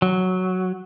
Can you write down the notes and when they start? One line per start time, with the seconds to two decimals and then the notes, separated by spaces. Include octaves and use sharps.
0.02 F#3